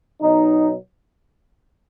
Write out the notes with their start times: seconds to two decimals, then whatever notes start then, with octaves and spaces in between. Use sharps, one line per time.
0.22 B2 F#3 D#4